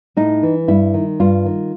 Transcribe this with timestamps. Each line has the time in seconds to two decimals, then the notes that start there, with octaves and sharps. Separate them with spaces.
0.17 A2 D#4
0.43 E3
0.68 G2 E4
0.94 D#3
1.20 G2 F4
1.45 D#3